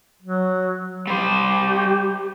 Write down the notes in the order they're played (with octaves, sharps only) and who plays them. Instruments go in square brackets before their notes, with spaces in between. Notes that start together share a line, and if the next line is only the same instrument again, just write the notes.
[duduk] F#3
[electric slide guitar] G3 C5 [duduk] G4